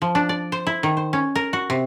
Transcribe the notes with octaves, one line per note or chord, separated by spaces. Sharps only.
F3
D4
D5
C5
E4
D#3
C5
C#4
A#4
F#4
C3